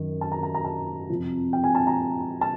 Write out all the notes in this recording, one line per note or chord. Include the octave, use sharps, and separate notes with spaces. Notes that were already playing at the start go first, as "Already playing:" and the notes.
Already playing: F#2 D#3
A5
A#5
A#5
A#5
A5
F2 C3 F3
G5
G#5
A5
A#5
A5